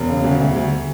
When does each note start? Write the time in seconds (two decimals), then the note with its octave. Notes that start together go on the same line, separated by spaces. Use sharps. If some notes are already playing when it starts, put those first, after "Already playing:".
Already playing: E1
0.09 C#3
0.24 D2
0.40 D2
0.56 D2